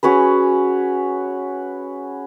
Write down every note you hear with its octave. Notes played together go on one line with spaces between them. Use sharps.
C#4 F#4 G#4 B4